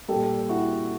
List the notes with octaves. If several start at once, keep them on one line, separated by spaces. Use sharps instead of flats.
A#2 G3 G4 A4
E4 F#4